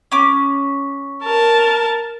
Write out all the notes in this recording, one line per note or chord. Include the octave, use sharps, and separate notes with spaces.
C#4 D6
A#4 A5